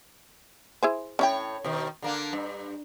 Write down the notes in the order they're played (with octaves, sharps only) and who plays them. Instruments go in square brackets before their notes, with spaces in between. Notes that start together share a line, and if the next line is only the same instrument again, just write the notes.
[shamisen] E4 G#4 C5
[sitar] A2 C#5 [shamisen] C#4 E4 G5
[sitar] B2 D#3
D3 A#3 D4
G2